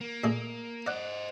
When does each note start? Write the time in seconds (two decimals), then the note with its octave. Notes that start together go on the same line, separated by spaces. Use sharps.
0.01 A#3
0.24 A#2 A3 G#4
0.87 C5 D5 D#5 F#5